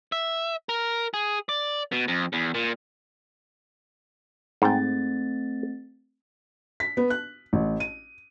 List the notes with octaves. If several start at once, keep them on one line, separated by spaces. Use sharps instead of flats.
E5
A#4
G#4
D5
B2
F2
E2
A#2
G#2 A3 C4 G5 A6
B6
B3
F#6
A1
D#7